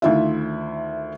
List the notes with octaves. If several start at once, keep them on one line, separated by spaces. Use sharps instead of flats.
D2 D#3 E4 F4 E5